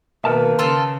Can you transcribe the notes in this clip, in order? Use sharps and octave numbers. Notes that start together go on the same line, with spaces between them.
B2 D#3 A#3 A#4 B4 A5
C#3 F4 A4 C6